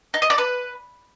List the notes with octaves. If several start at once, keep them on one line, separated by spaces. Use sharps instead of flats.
D#4
D#5
D5
B4